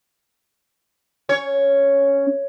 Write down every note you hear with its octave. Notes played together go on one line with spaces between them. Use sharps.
C#4 C#5